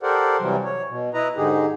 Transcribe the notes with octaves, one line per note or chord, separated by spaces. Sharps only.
G4 A4 A#4 C5 D5 F#5
C3 E3 F#3 G3
C#5
B2
E4 B4 D#5 A#5
G#2 D3 D#4 G4 G#4